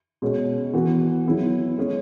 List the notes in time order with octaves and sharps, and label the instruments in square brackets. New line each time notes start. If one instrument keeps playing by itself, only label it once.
[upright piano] B2 G#3 C#4
E3 B3 F#4
F#3 B3 E4 G#4
G#3 C#4 G#4